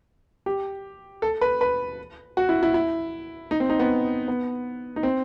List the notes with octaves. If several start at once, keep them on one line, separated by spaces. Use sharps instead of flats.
G4
A4
B4
B4
F#4
E4
E4
E4
D#4
C4
D#4
B3
B3
D#4
C4